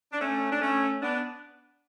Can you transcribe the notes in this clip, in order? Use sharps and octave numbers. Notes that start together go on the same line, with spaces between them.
D4
A3 C#4
D4
A3 C#4
B3 D4